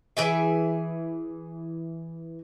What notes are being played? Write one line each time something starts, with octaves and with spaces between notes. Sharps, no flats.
E3 G#4 E5